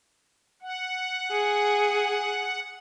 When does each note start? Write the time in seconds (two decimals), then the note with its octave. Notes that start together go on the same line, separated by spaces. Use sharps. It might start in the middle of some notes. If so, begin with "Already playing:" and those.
0.62 F#5
1.31 G#4